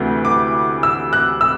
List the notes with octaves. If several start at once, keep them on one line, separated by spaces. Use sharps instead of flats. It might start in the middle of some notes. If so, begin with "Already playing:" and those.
Already playing: D2 C3 E3 A3
D6
E6
F#6
E6